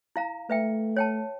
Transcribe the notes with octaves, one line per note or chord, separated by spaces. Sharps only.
E4 F5 A#5
A3 B4 E5 G5
C#5 G5 A5